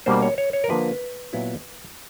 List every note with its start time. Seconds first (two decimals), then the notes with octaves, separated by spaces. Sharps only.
0.06 B2 G3 A#3 D4 C5
0.22 C#5
0.38 C#5
0.53 C#5
0.64 A#4
0.69 D3 F3 A#3 D4 B4
1.33 A#2 F#3 B3 E4